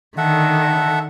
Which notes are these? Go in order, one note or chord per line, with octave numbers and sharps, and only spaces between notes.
D3 D#3 A4 E5 F#5